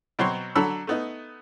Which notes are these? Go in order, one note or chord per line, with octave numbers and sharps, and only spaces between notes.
B2 F#3 C4 C#5 C6
D3 F#3 A4 B5 E6
A3 B3 D#4